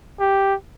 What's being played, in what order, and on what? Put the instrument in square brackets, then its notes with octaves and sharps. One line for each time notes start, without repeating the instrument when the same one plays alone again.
[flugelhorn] G4